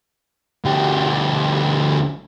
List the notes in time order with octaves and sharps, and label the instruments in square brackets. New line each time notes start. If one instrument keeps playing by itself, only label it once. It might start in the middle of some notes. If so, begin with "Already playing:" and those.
[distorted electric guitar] D2 G4